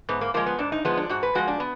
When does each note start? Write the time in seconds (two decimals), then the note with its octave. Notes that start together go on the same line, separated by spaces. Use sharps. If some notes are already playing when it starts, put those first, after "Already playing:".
0.09 G#2 B3
0.21 A#3
0.34 F3 G#3 A#3
0.46 B3
0.59 G#2 D4
0.72 D#4
0.85 F3 G#3 B3
0.97 D4
1.09 G#2 F#4
1.23 B4
1.35 F3 G#3 F#4
1.48 D4
1.60 B3